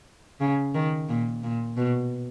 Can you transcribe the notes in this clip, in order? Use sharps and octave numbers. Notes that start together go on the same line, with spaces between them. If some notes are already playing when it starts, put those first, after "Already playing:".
C#3
D#3
A#2
A#2
B2